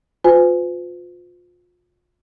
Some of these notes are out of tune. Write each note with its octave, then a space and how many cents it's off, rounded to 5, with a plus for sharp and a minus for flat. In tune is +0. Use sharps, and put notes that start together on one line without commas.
F4 +30 B4 +45 G#5 +0